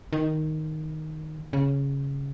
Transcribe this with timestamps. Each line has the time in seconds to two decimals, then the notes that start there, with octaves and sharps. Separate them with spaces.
0.13 D#3
1.53 C#3